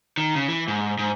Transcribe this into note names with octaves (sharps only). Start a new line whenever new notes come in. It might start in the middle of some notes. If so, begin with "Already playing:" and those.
D#3
C#3
E3
G#2
G#2